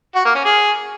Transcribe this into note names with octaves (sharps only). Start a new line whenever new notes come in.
F#4
A#3
C#4
G#4